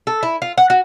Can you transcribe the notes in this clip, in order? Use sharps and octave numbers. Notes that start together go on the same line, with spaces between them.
A4
E4
F4
F#5
F#4